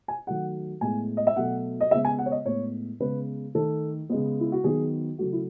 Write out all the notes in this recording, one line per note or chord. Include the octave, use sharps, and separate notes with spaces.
G#5
D#3 F#3 A3 F#5
A2 G#3 B3 G#5
D#5
E5
B2 F#3 A3 F#5
D#5
C#3 G#3 B3 E5
G#5
F#5
C#5
D#5
A2 G#3 B3 C#5
C#3 G#3 B3 B4
D#3 A3 A4
C#3 G#3 B3
E4
F#4
D#3 F#3 B3 G#4
C#3 F#3 A3 F#4
E4